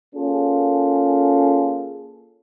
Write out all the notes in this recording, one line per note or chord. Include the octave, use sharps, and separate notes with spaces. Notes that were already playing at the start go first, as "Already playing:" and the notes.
A#3 C#4 F4 G#4 A4